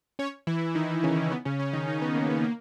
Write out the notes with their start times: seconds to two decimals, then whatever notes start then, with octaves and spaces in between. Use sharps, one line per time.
0.19 C#4 C#5
0.47 E3 E4
0.75 D#3 D#4
1.03 C#3 C#4
1.32 B3
1.45 C#3 C#4
1.59 C#3 C#4
1.73 D#3 D#4
1.87 D#3 D#4
2.02 B3
2.15 A#3
2.29 B3
2.44 A#3